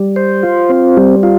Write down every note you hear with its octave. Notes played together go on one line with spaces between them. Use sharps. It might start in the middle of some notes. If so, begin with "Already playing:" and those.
Already playing: G3
C5
F4
C4
G3
F4